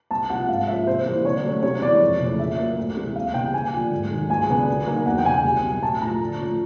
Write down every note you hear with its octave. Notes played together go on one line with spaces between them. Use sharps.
C2 A5
C3 F3 F#5
G#2 F5
F3 A#3 C#4 E5
C3 C5
E3 G3 A#3
D3 C#5
F#3 A3 C#4
C3 C#5
E3 G#3 B3 D5
F2
C#3 E3 A3 C#4
A#2 E5
F#3 A#3
D2
C3 E3 G#3
D#2 F5
C#3 E3 G3 B3 G5
D#2 G#5
D3 F3
G#2
D#3 F#3
C#2 G#5
C#3 F#3 B3 D4
D3
F#3 A#3 D#4
E2 F#5
G5
C#3 F#3 G#5
C2
B2 F#3
A2 A5
F3 A3 A#5
D3
F3 A3 C#4 F4